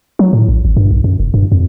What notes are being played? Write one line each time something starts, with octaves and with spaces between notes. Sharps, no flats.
F#3
A2
A#1
G#1
G2
B1
F#2
F1
G2
F2